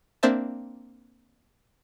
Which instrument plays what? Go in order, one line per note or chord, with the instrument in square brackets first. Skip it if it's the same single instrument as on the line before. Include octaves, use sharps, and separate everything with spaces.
[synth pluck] A#3 C4 D4 C5 E5 A5